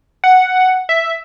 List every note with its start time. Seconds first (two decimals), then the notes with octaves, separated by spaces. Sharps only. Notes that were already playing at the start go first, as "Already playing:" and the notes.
0.24 F#5
0.89 E5